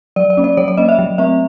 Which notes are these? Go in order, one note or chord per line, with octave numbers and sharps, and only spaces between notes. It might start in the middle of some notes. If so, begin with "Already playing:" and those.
F#3 D5
D5
A#3 C#4
D5
F#3 C#5
C#5
A#3 C#4 D#5
E5
F#3
A3 C4 E5